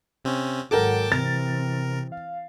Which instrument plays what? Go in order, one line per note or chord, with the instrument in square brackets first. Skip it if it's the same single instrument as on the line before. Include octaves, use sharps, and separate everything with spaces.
[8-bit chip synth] C3 C4 C#4
[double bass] G#1 F#3 [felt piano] A4 A#4 [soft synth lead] F#5 [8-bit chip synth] G5 A5 D6
[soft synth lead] C3 [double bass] E3 C4 [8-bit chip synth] A#4 [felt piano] A6
[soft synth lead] F5